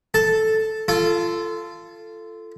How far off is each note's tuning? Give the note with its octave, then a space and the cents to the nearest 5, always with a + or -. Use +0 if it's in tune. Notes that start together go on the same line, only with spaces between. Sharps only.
A4 -5 A5 +0
F4 -25 A4 +0